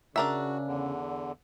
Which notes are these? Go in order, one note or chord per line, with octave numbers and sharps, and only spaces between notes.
C#3 D4 F#4 A#4 E5
E2 D3